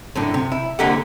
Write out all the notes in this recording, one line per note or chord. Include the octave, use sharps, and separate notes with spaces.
F#2 A2 D3
C3
E4
C2 D3 A#3 G4 A4 F#5